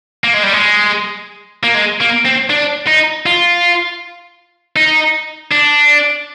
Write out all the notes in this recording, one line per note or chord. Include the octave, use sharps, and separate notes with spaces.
A#3
G#3
G3
G#3
A#3
G#3
A#3
C4
D4
D#4
F4
D#4
D4